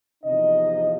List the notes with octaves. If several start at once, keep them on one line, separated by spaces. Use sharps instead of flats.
E2 C3 F3 D#4 D#5